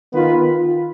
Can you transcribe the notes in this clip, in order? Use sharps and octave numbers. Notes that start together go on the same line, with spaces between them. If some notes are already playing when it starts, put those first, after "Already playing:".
D#3 B3 F4 B4